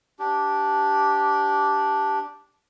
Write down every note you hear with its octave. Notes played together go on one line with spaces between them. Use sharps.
D4 G4